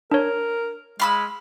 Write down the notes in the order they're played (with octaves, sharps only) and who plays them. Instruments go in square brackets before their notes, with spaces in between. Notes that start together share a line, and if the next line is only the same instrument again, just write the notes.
[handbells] D4 C#5 [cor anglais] A#4
[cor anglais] G#3 [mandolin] F5 B5 E6